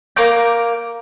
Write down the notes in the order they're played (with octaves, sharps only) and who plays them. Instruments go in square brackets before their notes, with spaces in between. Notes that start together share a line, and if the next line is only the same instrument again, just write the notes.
[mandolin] A#3 A#5 D6 G6